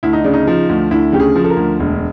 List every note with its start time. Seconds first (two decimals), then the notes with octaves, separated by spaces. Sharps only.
0.03 D2 E4
0.13 D#4
0.24 C#3 D4
0.34 D#4
0.47 F3
0.69 D2
0.91 D2 E4
1.12 C#3 G4
1.20 G#4
1.36 F3
1.44 A4
1.50 A#4
1.57 D2
1.80 E1